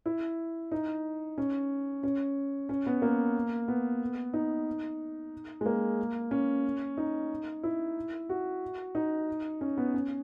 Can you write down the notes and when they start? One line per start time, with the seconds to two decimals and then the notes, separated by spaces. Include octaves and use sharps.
0.06 E4
0.72 D#4
1.38 C#4
2.03 C#4
2.69 C#4
2.86 B3
3.02 A#3
3.68 B3
4.33 D#4
5.61 G#3
5.66 A#3
6.31 C#4
6.97 D#4
7.63 E4
8.29 F#4
8.95 D#4
9.61 C#4
9.77 B3
9.94 C#4